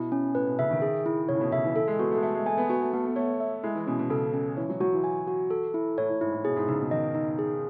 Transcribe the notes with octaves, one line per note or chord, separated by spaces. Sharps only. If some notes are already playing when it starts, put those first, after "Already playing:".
Already playing: B2 E4
C#4
A2 B4
B2
C#3 E5
D#3
G#4
E4
C#3 C#5
A2
B2
C#3 E5
E3
E3 A4
G#3
B3 F#4
A3
G#3
A3 E5
G#3
A3 G#5
B3
B3 F#4
A3
A3 B3
A3
A3 C#5
E5
G#3 E4
E3
B2 C#4
B2
C#3 A4
C#4
E3 C#5
F#3
F#3 F#4
E3
G#5
F#4
A4
E4
A2 C#5
A2
G#2 E4
A2
B2 G#4
G#2
C#3 D#4
B2
D#3 D#5
D#4
G#4